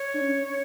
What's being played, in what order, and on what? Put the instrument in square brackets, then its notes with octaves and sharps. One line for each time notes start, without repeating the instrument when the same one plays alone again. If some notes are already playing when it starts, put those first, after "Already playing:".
Already playing: [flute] C#5
[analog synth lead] D4
C#4